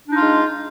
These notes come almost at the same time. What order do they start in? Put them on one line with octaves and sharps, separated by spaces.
D4 D#4 F4 G#3